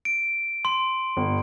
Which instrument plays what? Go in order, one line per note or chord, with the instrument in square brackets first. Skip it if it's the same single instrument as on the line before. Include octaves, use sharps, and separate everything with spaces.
[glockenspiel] D7
C6
[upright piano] G1